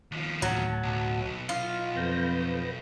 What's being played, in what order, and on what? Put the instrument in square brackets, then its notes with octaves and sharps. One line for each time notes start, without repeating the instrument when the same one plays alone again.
[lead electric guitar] D#2 F3
[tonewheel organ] D2 A2 A5 [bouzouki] F#3
[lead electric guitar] B1
[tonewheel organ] E4 [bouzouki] F4
[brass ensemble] F2 [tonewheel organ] B4 G6 A#6